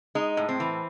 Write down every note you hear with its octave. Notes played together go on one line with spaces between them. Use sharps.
G#3 D#4
A2
C4
E3